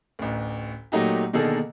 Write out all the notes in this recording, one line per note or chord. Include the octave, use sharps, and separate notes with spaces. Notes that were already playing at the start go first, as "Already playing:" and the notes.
A1 D2
A#2 F#3 A3 D#4 F#4 G4
B2 D3 D#3 A#3 G#4 A4